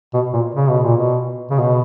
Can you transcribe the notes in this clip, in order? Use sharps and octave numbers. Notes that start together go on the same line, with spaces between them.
B2
A#2
C#3
B2
A#2
B2
C#3
B2